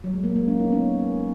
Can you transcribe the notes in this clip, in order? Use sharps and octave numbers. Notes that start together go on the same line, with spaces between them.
F#3
G#3
A#3
A#3
C#4
D#4
B3
C#4